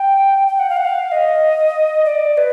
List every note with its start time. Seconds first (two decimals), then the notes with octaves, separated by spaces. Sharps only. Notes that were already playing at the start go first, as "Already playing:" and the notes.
Already playing: G5
0.48 G5
0.59 F#5
0.69 F5
0.77 F#5
0.85 F5
1.12 D#5
2.05 D5
2.37 B4